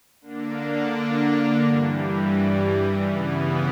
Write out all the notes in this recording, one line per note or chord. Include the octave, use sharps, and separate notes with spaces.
D3 A#3 D4
G2 E3 G3
C#3 E3 B3